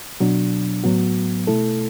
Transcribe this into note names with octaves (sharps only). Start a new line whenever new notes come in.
B2 F#3 D4 F#4
A2 F#3 B3 F#4
B2 A3 E4 A4